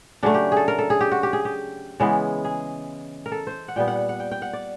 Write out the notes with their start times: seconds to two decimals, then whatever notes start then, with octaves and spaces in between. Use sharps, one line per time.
0.23 C#3 F#3 A3 D4
0.34 G4
0.52 G#4 A4
0.68 A#4
0.79 A4
0.90 G#4
1.01 G4
1.12 F#4
1.23 G4
1.33 G#4
1.45 G4
2.00 C#3 E3 G#3 B3
2.45 G#4
3.26 A#4
3.32 A4
3.47 C5
3.68 F#5
3.76 A#2 G3 B3 G5
3.88 F#5
3.99 F#5
4.09 F#5
4.20 G5
4.31 G5
4.42 F#5
4.53 D5